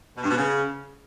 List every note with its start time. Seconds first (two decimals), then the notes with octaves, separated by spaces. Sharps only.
0.17 B2
0.23 G2
0.30 B2
0.37 C#3